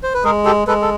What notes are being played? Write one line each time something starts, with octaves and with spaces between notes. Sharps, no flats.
C5
B4
G#3 G#4 A#4
G4 A4
G#3 A4 B4
A4